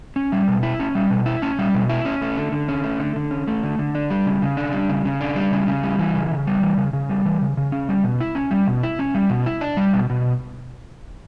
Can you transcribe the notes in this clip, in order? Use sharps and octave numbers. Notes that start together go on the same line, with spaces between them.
C#4
G3
B2
E4
C#4
G3
B2
E4
C#4
G3
B2
E4
C#4
A3
D3
D3
C#4
A3
D3
D3
C#4
A3
D3
D3
D4
G3
C#3
C#3
D4
G3
C#3
C#3
D4
G3
C#3
C#3
G3
E3
C#3
C#3
G3
E3
C#3
C#3
G3
E3
C#3
C#3
C#4
G3
B2
E4
C#4
G3
B2
E4
C#4
G3
B2
E4
D4
G3
B2
B2